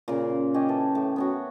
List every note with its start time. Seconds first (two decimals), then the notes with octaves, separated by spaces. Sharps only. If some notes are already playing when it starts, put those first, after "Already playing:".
0.08 A#2 C#3
0.54 C#4 G4 D#5
0.68 E3 A4
0.95 A2
1.16 B3 C#4 F#4